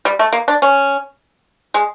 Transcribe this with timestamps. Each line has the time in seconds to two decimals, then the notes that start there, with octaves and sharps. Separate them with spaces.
0.05 G3
0.19 A3
0.33 A#3
0.48 D4
0.62 C#4
1.74 G#3